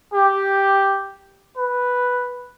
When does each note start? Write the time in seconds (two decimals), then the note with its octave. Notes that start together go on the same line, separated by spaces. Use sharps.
0.13 G4
1.57 B4